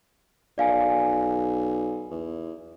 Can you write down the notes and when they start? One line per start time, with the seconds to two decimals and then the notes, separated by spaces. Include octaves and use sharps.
0.58 B1 D5 F5 G#5
2.11 E2